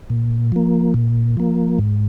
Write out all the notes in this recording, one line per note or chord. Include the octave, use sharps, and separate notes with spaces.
A#2
F3 A#3
A#2
F3 A#3
G#2